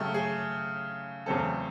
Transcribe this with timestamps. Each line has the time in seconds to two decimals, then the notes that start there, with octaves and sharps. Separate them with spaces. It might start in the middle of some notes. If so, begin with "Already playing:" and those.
Already playing: C#3 F#3 A3 G4
0.14 G#4
1.26 E2 C#3 F#3 A3 C4 A4